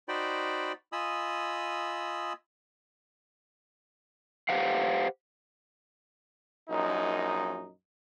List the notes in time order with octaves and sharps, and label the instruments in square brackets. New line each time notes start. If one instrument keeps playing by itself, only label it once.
[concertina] D#4 F#4 C5 D5 G5 B5
F4 D#5 G#5 B5 D#6 E6
[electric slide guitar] G4 B4 C5 F5 F#5
[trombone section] A#1 F#2 D#4